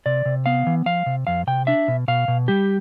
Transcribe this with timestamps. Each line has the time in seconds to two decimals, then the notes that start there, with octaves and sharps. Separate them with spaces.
0.06 C3 D5
0.26 C3
0.46 B3 F5
0.67 E3
0.86 F3 F5
1.06 C3
1.27 F2 F5
1.47 C3 G5
1.67 D4 E5
1.88 B2
2.08 B2 F5
2.28 B2
2.48 G3 G4